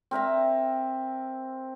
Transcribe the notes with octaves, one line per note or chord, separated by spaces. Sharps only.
C4 A#4 E5 A#5